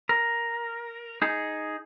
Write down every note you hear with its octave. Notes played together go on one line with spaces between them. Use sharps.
A#4
D#4 G#4